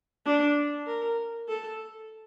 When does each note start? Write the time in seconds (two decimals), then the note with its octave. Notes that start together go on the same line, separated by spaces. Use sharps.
0.26 D4
0.87 A#4
1.48 A4